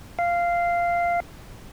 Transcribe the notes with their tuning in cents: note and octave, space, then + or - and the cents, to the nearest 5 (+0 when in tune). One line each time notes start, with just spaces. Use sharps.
F5 -10